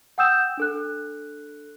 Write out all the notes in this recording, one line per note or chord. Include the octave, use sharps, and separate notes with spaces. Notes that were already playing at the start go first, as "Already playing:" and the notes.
F#5 G5 D#6 E6 G6 E7
D4 A4 F#6